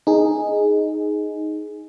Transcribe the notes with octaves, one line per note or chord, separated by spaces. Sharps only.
D#4 G#4